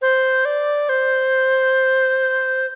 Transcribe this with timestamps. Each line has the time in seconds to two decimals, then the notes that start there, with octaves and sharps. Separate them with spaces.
0.02 C5
0.45 D5
0.89 C5